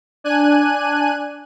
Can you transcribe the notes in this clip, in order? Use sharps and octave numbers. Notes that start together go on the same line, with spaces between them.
D4 G#5 F#6 D#7